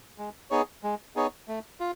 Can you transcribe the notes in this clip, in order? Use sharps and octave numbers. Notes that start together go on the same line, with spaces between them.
G#3
B3 D#4 G#4 C#5
G#3
B3 D#4 G#4 C#5
A3
F4